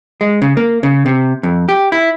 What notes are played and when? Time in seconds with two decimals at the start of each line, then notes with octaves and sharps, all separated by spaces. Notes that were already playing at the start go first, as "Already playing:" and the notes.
0.21 G#3
0.42 C#3
0.57 A#3
0.83 C#3
1.06 C3
1.43 F2
1.69 G4
1.92 E4